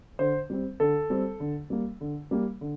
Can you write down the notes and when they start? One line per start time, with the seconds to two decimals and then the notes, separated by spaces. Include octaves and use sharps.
0.19 D3 C5
0.50 G3 C4
0.80 D3 A4
1.10 G3 C4
1.40 D3
1.70 G3 A#3
2.01 D3
2.31 G3 A#3
2.61 D3